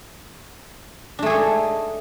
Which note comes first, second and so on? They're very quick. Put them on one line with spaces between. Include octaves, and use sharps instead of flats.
D4 A3 G#4 A4 D#4